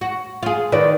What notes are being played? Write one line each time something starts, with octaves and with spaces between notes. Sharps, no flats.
F#4
F4 G#4
D#3 B4 D5